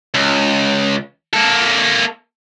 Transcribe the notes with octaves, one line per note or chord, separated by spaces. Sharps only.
C#2
A#3 A4